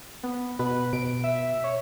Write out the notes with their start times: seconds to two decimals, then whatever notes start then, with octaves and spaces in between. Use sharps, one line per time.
0.23 B3
0.59 B2 B4
0.93 B2 D7
1.24 E5
1.64 C#5